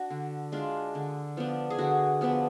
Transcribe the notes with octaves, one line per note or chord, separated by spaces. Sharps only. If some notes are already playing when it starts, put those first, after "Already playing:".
Already playing: D4 F#4
D3
G#3 D4 F4
D3
F3 B3 D4
G#4
D3 F#4
F3 B3 D4